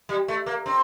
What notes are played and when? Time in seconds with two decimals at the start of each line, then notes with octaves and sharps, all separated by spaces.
0.09 G3
0.28 A3
0.46 A#3
0.66 C4